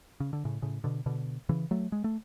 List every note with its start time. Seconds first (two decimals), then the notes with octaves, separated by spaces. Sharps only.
0.20 C#3
0.33 D3
0.45 A2 C#3
0.62 A2 C#3
0.84 B2 D3
1.06 B2 D3
1.49 C#3 E3
1.71 F#3 A3
1.92 G#3
2.04 A3